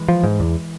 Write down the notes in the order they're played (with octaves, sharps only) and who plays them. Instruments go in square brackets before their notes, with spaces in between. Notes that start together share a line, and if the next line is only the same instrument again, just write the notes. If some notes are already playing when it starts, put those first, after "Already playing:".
Already playing: [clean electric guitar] E3 G#3
[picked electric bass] F3
G#2
E2